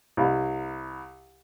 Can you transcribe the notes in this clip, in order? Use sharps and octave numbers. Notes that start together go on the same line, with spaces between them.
C2